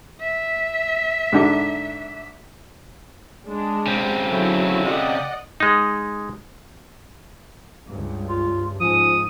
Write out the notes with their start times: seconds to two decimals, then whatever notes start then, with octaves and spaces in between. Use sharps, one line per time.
0.21 E5
1.33 G#2 D3
3.49 G#3 D4
3.87 C#3 C4
4.28 D3 F#3 E4
4.85 D5 D#5 F#5
5.60 G#3 D#4
7.87 C#2 G2
8.29 F4
8.81 G#2 F3 C#4 D#6